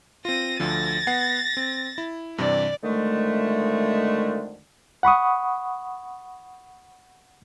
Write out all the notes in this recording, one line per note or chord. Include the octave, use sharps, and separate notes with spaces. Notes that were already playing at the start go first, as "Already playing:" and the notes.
C4 F4 A#6 D#7
D2 D3 F3 A6 A#6
B3 F#5 C7
C4
E4
G2 C3 E3 D5
F2 D3 D#3 G#3 A3
F#5 B5 C#6 D#6